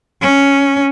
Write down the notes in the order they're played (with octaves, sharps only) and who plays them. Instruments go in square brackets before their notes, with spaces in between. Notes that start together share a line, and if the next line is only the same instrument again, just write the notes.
[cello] C#4